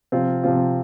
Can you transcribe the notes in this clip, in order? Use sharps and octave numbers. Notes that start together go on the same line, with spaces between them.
C3 F3 C4 F4
C3 F3 C4 F4